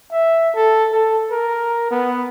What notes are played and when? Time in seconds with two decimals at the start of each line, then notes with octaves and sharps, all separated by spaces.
0.12 E5
0.55 A4
0.92 A4
1.31 A#4
1.91 B3